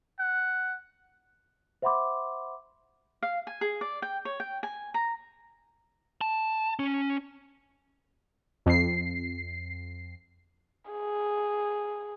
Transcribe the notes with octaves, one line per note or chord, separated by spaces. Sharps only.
F#5
C5 E5 F#5 B5 C6 D6
F5
G#5
G#4
D5
G5
C#5
G5
G#5
A#5
A5
C#4
F2 C7
G#4